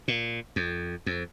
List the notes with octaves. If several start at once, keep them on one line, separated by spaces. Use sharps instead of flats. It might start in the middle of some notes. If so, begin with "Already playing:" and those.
A#2
F2
F2